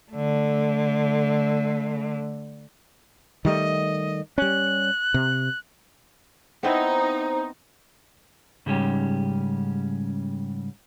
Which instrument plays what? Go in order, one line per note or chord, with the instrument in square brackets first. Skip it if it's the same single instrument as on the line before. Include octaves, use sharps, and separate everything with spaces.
[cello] D3 A3
[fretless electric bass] D#3 G3 A3 [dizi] D#5
[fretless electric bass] G3 C#4 [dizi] F#6
[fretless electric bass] C3
[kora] B3 C4 E4 [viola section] D#4 [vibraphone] C5 A#5
[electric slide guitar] G#2 C#3 G3 C#4 G4